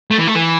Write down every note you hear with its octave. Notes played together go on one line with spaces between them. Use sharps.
A3
E3
A3
E3